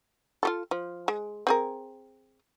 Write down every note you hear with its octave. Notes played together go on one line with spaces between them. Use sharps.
F4 G4 A4
F3
G#3
C4 G#4 A#4